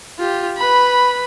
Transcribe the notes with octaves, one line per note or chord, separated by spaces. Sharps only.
F4 G4
B4 B5